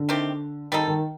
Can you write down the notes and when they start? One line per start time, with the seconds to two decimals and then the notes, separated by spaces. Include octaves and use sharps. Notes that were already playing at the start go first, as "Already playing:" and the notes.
Already playing: D3
0.09 D#3 A3 C4 G4
0.72 D#3 G3 C4 D#4 A4
0.88 D#3